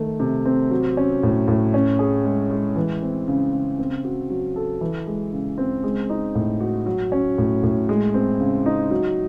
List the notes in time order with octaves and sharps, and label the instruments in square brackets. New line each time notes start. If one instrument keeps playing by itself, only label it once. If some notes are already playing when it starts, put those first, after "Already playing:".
Already playing: [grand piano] D#3 A3
C3
C4
F#3
C#4
A2
A2
C#4
G#4
G#3
G#3
E3
C4
C#3
C#3
C4
F#4
F#3
A4
E3
G#3
C#3
C4
G#3
D#4
A2
F#4
F#3
C#4
A2
A2
G#3
C4
C#3
D#4
F#3